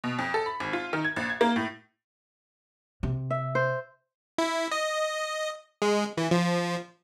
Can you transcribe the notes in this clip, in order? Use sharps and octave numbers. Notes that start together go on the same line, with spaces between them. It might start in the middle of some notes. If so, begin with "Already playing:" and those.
B2
F2
A4
B5
G#1
F4
D#3
G#6
A#1
G#6
A#3
A2
C3
E5
C5
E4
D#5
G#3
E3
F3